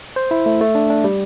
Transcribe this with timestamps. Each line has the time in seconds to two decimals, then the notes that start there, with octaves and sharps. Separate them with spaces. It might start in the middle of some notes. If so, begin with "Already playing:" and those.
0.16 C5
0.31 E4
0.46 A3
0.61 A3
0.75 D4
0.90 D4
1.04 G3